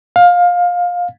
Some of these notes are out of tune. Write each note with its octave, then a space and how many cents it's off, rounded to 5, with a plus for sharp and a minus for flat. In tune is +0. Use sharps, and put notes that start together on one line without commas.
F5 +20